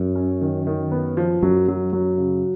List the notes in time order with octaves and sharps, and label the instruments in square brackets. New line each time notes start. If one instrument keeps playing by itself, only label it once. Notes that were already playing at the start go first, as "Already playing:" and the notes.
Already playing: [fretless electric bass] F#2
[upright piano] C#4
D#3
D#3
B3
F3
[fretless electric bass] F#2 [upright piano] F#3
[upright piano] F#3
F#3
C#3